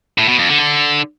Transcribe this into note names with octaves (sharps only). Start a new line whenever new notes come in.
A2
B2
F2
D3
D3